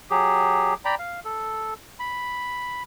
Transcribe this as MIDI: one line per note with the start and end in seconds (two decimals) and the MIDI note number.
0.10 0.74 54
0.10 0.74 67
0.10 0.74 68
0.85 0.95 74
0.85 0.95 79
0.85 0.95 82
0.85 0.95 83
0.99 1.20 77
1.25 1.74 69
2.00 2.83 83